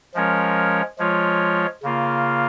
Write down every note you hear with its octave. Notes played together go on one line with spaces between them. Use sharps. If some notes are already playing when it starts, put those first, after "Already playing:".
F3 G#3 C#4 A#4 C#5
F3 G#3 F4 C#5
C#3 A#3 F4